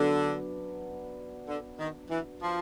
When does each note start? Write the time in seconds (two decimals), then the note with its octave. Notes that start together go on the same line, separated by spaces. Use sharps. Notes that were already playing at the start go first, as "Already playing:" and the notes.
Already playing: D3 F#3 B3 D4
1.47 D3
1.79 D#3
2.10 E3
2.41 F3